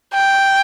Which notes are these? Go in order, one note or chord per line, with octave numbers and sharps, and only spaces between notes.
G5